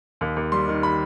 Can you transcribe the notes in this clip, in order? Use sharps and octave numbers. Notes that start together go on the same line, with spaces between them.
D#2
D#2
G3 C6
D#3
B5